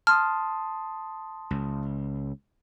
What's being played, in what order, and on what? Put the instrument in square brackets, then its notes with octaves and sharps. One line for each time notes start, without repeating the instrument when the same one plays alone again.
[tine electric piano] A5 C6 D#6 [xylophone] F6
[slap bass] C#2